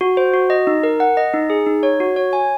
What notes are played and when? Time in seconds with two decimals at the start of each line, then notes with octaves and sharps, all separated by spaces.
0.01 F#4
0.17 C5
0.34 F#4
0.50 D#5
0.67 D#4
0.83 A#4
1.00 F#5
1.17 D#5
1.33 D#4
1.50 G#4
1.66 D#4
1.83 C#5
2.00 F#4
2.16 C#5
2.33 G#5